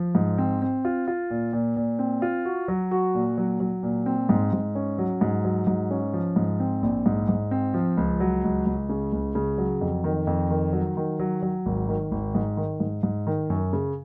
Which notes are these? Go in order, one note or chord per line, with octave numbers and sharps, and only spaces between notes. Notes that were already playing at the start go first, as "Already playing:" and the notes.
Already playing: F3
G#2
C4
C4
F4
F4
A#2
A#2
A#2
C4
F4
F#4
F#3
F#4
A#2
F#3
F#3
A#2
C4
G#2
G#2
C#4
F#3
G#2
F#3
G#2
C#4
F3
G#2
C4
A#1
G#2
G#2
C4
F3
C#2
F#3
C#2
C#2
C#3
C#2
C#3
F#3
F2
D#3
F2
D#3
F#3
D#3
F#3
F#3
G#1
D#3
G#1
G#2
D#3
G#2
G#2
D#3
F#2
C#3